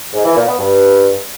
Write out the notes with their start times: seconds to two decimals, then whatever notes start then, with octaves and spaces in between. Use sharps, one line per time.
0.14 G#2
0.25 E3
0.36 A#2
0.47 B3
0.58 G2